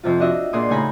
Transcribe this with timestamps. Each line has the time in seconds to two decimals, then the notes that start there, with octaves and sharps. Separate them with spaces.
0.03 F2 C3 F4
0.20 D4 F#4 D#5 E5
0.53 A#2 D4 G#4 C6 D#6
0.69 A2 C#3 D#4 G#5 A#5 B5